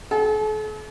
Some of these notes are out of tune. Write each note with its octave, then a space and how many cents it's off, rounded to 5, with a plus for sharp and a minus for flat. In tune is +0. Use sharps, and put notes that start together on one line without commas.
A4 -45